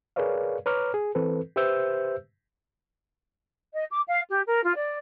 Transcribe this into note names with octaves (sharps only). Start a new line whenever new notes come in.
G#4 A#4 B4 C#5 D5 F5
B4 C#5 A#5 D6 F6
G#4
E3 C4 A4 B4
G4 B4 C5 E5 E6 G6
D#5
D6
F5
G4
A#4
F4
D5